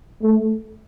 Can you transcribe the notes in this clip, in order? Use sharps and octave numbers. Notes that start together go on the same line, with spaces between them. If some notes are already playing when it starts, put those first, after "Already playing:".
A3